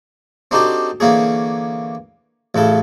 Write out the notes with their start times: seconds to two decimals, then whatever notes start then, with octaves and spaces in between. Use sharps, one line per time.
0.51 C4 D4 D#4 F#4 G4 A4
1.00 D3 E3 A#3 C#4 G#4
2.55 A1 C#3 E4 A4